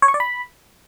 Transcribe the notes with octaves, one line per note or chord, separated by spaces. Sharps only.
C#5
C#6
D5
B5